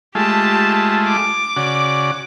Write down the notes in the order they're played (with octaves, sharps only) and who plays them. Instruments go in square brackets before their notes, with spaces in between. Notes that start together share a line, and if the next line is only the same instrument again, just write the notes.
[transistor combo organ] G#3 A3 F4 [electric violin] G4 A5
[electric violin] D6
[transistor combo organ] C#3 F#4 D5